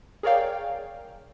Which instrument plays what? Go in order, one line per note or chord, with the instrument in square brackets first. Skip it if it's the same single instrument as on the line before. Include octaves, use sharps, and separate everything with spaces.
[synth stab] G#4 A#4 C#5 D5 F5 G5